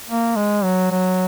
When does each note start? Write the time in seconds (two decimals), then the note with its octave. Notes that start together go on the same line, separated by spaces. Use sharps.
0.09 A#3
0.36 G#3
0.63 F#3
0.91 F#3